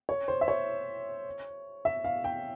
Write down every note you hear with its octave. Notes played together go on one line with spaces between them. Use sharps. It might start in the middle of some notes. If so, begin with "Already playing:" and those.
C#5
C5
E5
C#5
E5
F5
G5